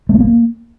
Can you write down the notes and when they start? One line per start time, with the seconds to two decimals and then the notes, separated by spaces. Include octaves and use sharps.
0.09 A3
0.15 B3
0.20 A#3